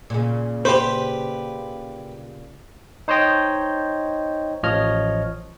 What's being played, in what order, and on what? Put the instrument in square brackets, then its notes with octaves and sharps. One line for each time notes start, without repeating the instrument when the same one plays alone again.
[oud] A#2 C#3
[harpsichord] G4 B4 [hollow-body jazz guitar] C5
[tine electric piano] D#4 C5 C#5 D#5 G5
A1 F3 C#5 D#5 F6